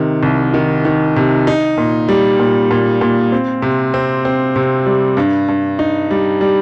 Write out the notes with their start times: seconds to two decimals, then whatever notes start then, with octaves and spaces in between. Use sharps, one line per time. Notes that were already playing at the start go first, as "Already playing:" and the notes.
Already playing: C3 D#3
0.23 C2
0.54 D#3
0.85 D#3
1.16 C3
1.47 D#4
1.78 A#2
2.09 G3
2.39 A#2
2.71 A#2
3.01 A#2
3.32 C4
3.62 C3
3.94 C4
4.25 C4
4.56 C3
4.86 G3
5.17 G2
5.48 G2
5.79 D#4
6.11 G3
6.41 G3